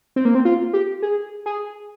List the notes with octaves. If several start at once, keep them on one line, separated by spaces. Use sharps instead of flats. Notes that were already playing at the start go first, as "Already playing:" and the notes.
C4
A#3
C4
F4
G4
G#4
G#4